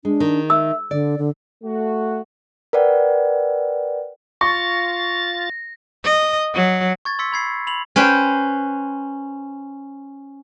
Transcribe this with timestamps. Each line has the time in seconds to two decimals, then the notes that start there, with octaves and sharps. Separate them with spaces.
0.05 G#3 D4
0.20 D#3
0.50 E5 E6
0.91 D3 D5
1.18 D3
1.64 A3 F#4
2.73 A#4 B4 D5 F#5 G5
4.41 F4 C#6 A6 A#6
6.04 D#5
6.54 F#3
7.05 C#6 G#6 A6
7.19 C6 E6 B6 C#7
7.32 B5 G#6 C7
7.67 B5 F7 F#7
7.96 C#4 B4 C5 G5